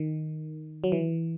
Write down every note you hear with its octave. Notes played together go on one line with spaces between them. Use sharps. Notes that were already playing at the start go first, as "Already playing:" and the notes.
Already playing: D#3
F#3
E3